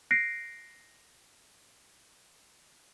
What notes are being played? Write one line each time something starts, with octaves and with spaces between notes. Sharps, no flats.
F#6 A#6 C7 D7